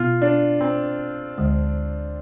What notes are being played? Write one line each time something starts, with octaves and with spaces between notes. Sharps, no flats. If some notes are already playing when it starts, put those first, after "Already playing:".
Already playing: B2 B3 E4 F4
D4
C4
D2 D3 G#3